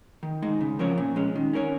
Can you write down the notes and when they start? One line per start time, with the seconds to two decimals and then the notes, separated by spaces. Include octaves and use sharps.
0.23 D#3
0.42 G#3 D#4
0.61 C#3
0.79 F3 C#4 A#4 C#5
0.98 A#2
1.16 G#3 C#4
1.35 D#3
1.53 C#4 A#4 C#5